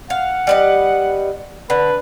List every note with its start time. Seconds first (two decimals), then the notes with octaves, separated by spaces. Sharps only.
0.10 F5 F#5
0.47 G3 B4 D#5
1.70 D3 B4